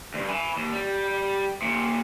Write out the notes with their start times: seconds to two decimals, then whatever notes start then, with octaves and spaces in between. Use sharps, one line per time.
0.14 D2 G2
0.29 G#5 B5
0.56 D#2
0.72 G3
1.62 D#2 A#2